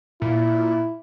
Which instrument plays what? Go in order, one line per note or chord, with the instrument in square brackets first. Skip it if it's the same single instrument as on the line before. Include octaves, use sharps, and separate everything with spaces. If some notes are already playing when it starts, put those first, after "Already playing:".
[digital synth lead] A#2 [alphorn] E4